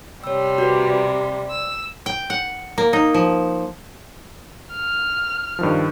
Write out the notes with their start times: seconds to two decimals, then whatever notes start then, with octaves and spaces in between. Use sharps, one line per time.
0.24 C3 G3 C#5 E6
0.58 F#4 B4
0.90 D5
1.50 E6
2.06 G5
2.30 F#5
2.78 A#3
2.93 D#4
3.14 F3
4.73 F6
5.59 G2 D#3 F3